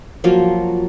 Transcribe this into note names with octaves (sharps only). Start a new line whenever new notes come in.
F3 F#3 A#3 F4